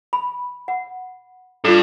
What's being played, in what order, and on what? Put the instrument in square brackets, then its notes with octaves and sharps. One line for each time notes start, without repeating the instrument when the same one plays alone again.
[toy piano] B5
F#5
[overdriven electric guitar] G2 [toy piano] F4 A4